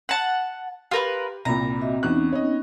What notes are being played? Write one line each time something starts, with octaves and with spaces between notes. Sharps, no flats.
F#5 A5
F4 G4 A#4 B4
C2 A#2 C4 A#5 B5
F#4 D#5 E5
E2 B3 C#4 D#4 F#6
C#5 D#5